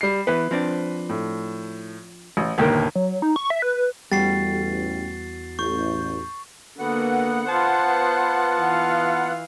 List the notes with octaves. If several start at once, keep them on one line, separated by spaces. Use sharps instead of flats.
G3 C7
E3 B3 B4
F3 C4 D4
A2
A1
G1 D#2 A#2 G4 A#4
F#3
D#4
C#6
E5
B4
A1 E2 G3 F#4 A6 C7
A1 C#6 G6
D3 A#3 B3 F#4 F#5
F4 C5 A5
E3 F5